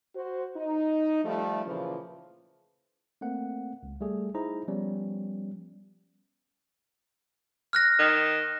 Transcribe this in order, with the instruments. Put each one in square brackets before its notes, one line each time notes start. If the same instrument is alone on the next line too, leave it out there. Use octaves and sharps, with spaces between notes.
[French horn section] F#4 C5
D#4
F3 G3 A3
A#2 C#3 E3 F3
[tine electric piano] A3 A#3 C4 F#5
C#2
G3 A3 G#4
D#4 E4 G#4 C5 A#5
F3 G3 B3 C#4
[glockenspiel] F6 F#6 A#6
[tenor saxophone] D#3